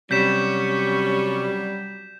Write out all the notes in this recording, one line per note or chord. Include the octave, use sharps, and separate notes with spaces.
C3 F#3 G3 C#4 G6 B6 E7